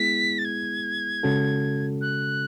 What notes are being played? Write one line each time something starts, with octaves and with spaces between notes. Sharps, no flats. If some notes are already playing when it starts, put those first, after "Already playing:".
Already playing: G#3 B3 E4 G#4 B6
A6
G#6
C#3 G#3 C#4 F#4 A4
F#6